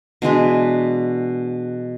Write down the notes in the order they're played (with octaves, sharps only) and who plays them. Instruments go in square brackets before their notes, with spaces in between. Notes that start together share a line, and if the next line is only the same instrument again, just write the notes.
[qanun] B2 E3 G#3 D4